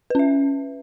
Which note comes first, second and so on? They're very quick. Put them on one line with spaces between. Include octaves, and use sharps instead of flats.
B4 C#4 E5